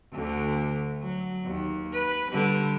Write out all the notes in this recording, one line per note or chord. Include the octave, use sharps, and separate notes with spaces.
D2 D3
F#3
D#2
B4
D3 G3